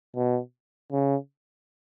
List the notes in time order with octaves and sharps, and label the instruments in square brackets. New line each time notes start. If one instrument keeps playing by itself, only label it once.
[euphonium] B2
C#3